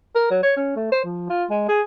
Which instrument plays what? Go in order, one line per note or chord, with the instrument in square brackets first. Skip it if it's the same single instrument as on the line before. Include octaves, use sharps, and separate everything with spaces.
[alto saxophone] A#4
F#3
C#5
C#4
A3
C5
F3
F4
G#3
G#4